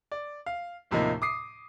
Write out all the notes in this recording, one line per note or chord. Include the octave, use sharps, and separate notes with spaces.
D5
F5
D#2 A2 C3 F3 A#3 D#4
D6 D#6 C7